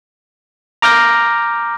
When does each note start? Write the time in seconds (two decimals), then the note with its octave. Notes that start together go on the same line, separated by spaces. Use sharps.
0.82 A#5 D6 F6 G6 A#6